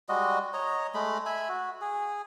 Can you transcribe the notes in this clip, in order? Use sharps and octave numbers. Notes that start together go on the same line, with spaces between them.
G3 G#3 F#4 D#5
C#5 D#5 A#5
G#3 A3 B5
E5 G#5 B5
F#4
G#4